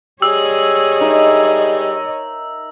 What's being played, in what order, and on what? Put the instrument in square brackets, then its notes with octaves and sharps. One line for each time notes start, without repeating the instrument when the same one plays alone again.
[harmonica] G3 G#4 [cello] C#5 D#5 [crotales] E6
[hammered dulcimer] D#4 A#4 E5